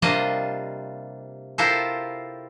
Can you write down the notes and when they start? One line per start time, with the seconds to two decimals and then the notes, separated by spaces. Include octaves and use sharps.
0.02 C3 G3 A#3 D4 F4 D#5
1.58 E4 F4 G4 A4 A#4 C5